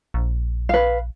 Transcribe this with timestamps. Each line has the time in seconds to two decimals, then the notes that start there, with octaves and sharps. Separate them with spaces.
0.14 A#1
0.69 B4 F5